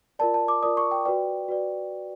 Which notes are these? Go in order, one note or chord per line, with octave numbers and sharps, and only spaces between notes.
F4 A#4 D5 A5
A5
D6
F4 A#4 D5 D#6
C#6
G5
F#4 B4 D5 G5
F#4 B4 D5